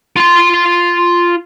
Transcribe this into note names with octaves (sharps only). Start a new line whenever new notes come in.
F4 C6